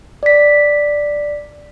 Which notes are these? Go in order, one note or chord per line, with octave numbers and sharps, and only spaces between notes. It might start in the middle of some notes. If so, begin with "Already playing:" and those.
D5 B6